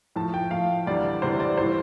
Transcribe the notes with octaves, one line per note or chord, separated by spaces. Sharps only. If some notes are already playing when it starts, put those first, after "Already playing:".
A2 F3 A5
G5
A2 F3 F5
D2 C3 E3 G3 D5
D2 C3 E3 G3 C5
D5
A2 E3 G3 C5